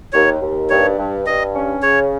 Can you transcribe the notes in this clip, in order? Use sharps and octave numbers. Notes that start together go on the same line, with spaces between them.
D#2 C#5
D#2
G2 C#5
G2
G2 D#5
C#4
C#3 C#5